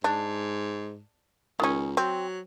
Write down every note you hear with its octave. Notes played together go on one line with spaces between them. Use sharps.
G#2 D4
C#2 D#3 C#4
F#3 C4